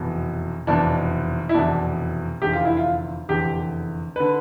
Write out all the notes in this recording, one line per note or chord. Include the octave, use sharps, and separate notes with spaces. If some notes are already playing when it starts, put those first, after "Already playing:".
Already playing: F1 E2 B2
F1 E2 B2 D4
E4
F1 E2 B2 D4
F1 E2 D3 G4
F4
E4
F4
F1 E2 D3 G4
D3 B4